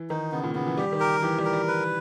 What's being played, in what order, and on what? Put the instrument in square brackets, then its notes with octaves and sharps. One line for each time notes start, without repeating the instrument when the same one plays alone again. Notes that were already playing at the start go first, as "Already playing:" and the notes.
Already playing: [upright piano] E3
[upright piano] D#3 [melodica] D#4
[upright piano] C#3 [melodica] B3
[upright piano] A#2
[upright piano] C#3 [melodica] B3
[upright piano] E3
[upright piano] G3 [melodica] G4
[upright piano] D#3
[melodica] A#4
[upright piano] E3 [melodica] G4
[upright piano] G3
[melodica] A#4
[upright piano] G3
[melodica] B4